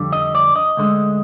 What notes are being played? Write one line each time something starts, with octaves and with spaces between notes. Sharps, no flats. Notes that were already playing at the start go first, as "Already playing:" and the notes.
Already playing: F2 D3 G3
D#5
D5
D#5
D2 D3 G#3